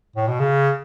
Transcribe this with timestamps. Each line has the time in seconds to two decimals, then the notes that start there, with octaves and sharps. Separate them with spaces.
0.16 A2
0.28 B2
0.40 C#3